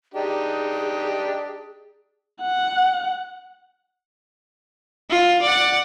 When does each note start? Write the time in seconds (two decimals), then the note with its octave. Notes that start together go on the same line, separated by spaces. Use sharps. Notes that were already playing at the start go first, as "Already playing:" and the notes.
0.14 D4 D#4 G4 G#4
2.41 F#5
5.10 F4
5.42 D5 F#5